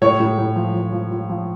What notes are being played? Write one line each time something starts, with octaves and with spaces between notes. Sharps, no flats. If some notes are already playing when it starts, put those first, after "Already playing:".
A2 C#5
A2
A2
F3
F3
F3
F3
F3